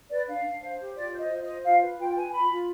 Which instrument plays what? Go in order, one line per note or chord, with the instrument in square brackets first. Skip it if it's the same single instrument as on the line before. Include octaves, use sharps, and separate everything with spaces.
[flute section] B4 D5
D4 F5
D4
C5
G4
F4 D5
C5
D#5
F4
D#5
C5
F4 F5
B4
F4 G5
B4 G#5
F4 B5
F4